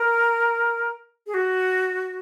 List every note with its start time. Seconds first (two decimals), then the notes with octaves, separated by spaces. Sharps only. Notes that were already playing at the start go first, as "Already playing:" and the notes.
Already playing: A#4
1.27 G#4
1.34 F#4